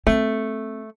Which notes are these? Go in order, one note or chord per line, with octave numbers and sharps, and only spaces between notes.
A3 C4